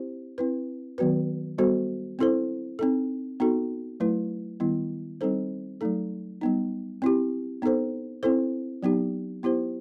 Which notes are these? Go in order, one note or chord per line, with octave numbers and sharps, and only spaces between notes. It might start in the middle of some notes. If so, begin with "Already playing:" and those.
Already playing: C4 E4 G4 C5
C4 E4 B4
D#3 F#3 B3 F#4 B4
G3 B3 F#4 A4 C5
C4 E4 A4 C5
C4 D#4 A4
B3 D#4 F#4 A4
F#3 A3 E4 B4
D#3 G3 B3 E4
G3 C4 D#4 A4 C5
F#3 A3 D#4 A4
G3 B3 D#4
C4 E4 G4
B3 D#4 A4 C5
C4 E4 A4 C5
F#3 B3 D#4 G4
B3 E4 G4 C5